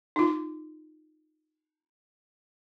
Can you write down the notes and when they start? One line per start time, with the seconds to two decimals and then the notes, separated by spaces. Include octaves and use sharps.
0.16 D#4 F4